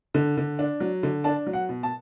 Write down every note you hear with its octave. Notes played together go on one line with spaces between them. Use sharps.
D3
D3
D4
F#3
D3
D4 A5
F#3
F#5
B2
A5